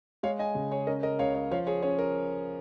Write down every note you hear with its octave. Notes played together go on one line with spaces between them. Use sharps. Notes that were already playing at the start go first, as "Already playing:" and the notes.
G#3 C#5 F5
D#5 G#5
C#3
G#4 C#5
C#4 A#4 D#5
A#4 D#5
C#2 C#5 F5
C#5 F5
F3 C#5 F5
G#4 C#5
C#4 G#4 C#5
A#4